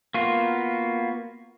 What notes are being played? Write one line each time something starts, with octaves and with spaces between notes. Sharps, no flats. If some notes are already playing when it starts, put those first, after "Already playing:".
A#3 B3 F4 F#4